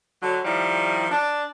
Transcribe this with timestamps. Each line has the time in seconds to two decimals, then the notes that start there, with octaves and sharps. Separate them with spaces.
0.21 D3 F#3
0.45 D#3 F3 G3 E4
1.11 D4